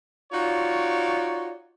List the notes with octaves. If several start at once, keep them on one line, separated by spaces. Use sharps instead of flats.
D#4 F4 F#4 C#5 D5